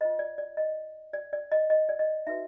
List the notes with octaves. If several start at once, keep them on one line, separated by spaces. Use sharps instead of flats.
F4 A4 C5 D#5
D5
D5
D#5
D5
D5
D#5
D#5
D5
D#5
D#4 F#4 B4 E5